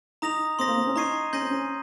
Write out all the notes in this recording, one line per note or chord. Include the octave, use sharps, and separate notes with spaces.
D#4 A#5 D#6 A#6 F7
C4 C6 D#6 A#6
A#3
C4
C#4
D#4 A#5 C#6 G#6 C7 D#7
C#4 C6 G6 A#6 D#7
C4
C#4